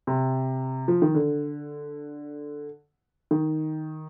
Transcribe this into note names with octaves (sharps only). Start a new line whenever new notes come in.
C3
F3
D#3
D3
D#3